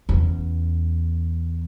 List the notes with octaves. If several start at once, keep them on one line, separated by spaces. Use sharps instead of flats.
E2 C#4